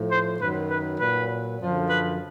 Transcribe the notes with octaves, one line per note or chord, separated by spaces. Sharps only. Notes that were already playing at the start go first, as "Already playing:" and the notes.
Already playing: A2 F3
C5
F#2 D#3 F#3 B4
B4
A#2 F#3 B4
F#2 D3 F3
B4